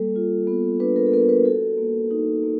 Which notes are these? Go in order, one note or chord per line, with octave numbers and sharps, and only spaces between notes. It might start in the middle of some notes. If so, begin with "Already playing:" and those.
Already playing: G3 A#3 A4
F4
B3
D4 B4
A#4
A4
B3 A#4
B4
F#4 A4
A#3
D#4
A#3